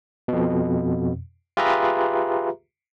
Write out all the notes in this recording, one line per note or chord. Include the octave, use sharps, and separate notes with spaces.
F2 B2
F4 G4 G#4 B4 E5 A#5